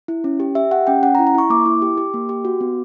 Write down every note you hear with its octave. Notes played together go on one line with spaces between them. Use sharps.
E4
C#4
G4
G4 E5
G4 F#5
C#4 G5
C#4 F#5
A#5
E4
A#5
E4 C#6
A#3 D6
E4
G4
G4
A#3
G4
F#4
B3